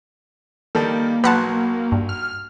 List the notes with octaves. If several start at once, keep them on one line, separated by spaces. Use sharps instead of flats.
D#3 G3 A#3 A4
B1 F#3 B4 F#5 A5 C6
G2
F6